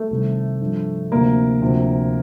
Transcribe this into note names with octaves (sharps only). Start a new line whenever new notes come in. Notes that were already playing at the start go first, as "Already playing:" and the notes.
Already playing: A3
C2 C3 D#3
G2 F3
D2 C3 F3 A#3
D2 C3 F3